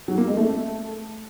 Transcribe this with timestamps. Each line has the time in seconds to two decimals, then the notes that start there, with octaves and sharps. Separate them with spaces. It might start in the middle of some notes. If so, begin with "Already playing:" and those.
0.08 F#3
0.18 A#3
0.27 G#3
0.37 A3